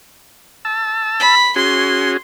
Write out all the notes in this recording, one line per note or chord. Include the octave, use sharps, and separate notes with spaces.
A5 E6
B5
C#4 F#4 G#4 C6